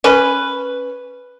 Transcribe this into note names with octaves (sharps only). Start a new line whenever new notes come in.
C#4 B4